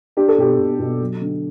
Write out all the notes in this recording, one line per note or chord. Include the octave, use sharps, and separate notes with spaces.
D4 G4
A4
B2 G4
B2
B2
F#3
D3